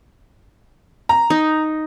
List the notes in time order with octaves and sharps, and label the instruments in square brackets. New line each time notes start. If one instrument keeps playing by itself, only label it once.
[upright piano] A#5
[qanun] D#4